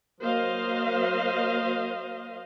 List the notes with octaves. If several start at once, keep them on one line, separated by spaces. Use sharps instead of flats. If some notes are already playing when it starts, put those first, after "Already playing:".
F#3 A#3 C5 D#5 F5